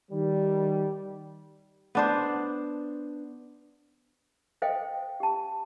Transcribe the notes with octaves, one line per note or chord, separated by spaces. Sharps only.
D#3 G3
B3 D4 C5
A4 C5 D#5 F5 G5
G4 A5